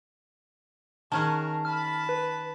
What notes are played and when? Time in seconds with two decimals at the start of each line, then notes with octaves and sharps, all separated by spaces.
1.12 D#3 C#4 G#4 A#4 F#5 A5
1.65 A5 B5 F6
2.09 B4